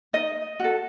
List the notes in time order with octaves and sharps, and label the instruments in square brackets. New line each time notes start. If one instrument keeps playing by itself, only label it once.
[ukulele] D#4 D#5
F#4 A4